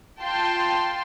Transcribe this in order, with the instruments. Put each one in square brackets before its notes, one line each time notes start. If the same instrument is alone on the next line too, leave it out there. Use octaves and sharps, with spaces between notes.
[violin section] F4 G5 A5 C6